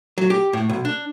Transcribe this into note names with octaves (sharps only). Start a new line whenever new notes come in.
F#3
G4
A2
B1
D4